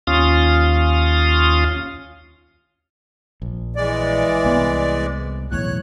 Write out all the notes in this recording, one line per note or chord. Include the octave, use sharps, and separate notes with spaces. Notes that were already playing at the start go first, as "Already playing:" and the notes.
D#2 C#4 F4 F5 D#6
A#1
E3 G#3 D5
C2 B3
B1 E2 A2 C#5 F#6